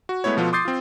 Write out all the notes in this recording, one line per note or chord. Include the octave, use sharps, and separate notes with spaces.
F#4
G#3 A3 B3 E4 C#5
B2 F3 B3 F4 A4
C6 D6 D#6 G6 A6 C7
C4 F4